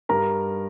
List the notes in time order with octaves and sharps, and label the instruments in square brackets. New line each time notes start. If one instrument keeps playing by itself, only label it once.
[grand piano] G2 A#4 A#5